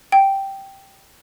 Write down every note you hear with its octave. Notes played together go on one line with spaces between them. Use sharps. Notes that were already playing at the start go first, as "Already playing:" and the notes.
G5